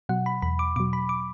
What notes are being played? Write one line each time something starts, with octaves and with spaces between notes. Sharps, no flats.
B2 F#3 F#5
B5
E2 B5
D6
B2 F#3 D6
B5
D6